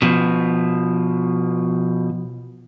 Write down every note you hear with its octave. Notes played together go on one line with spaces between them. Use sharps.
B2 F3